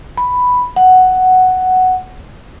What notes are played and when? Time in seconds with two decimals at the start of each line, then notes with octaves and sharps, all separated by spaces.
0.18 B5
0.76 F#5